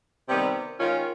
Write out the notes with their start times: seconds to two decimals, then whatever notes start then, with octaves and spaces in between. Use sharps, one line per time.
0.29 C3 D#3 G3 B3
0.80 D#3 G#3 C#4 F4